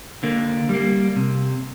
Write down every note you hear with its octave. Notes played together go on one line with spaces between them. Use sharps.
D3 A#3
G3 A#3
C3